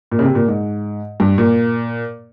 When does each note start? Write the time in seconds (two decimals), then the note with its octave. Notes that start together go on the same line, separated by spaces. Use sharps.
0.11 A#2
0.19 C#3
0.24 C3
0.35 A#2
0.48 G#2
1.20 G2
1.38 A#2